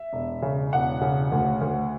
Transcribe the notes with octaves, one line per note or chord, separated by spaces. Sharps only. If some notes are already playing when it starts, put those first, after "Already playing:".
Already playing: E5
E1
C#3
E1 F#5
C#3
D2
D2